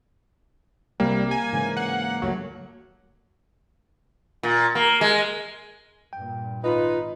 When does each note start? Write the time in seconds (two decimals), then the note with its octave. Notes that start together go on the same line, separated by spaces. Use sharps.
1.00 C2 C3 G3 A#3
1.31 G#5
1.53 G#2 C#3 E3
1.77 F#5
2.22 C#2 G2 F#3 A3
4.43 A#2
4.75 A#3
5.01 G#3
6.13 G2 A#2 G5
6.64 G#1 D#4 F4 B4 D#5 B5